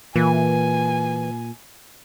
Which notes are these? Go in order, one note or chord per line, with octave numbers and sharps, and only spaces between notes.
A#2 E3 G#5